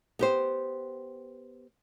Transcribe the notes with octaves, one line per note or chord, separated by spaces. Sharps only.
B3 G4 C5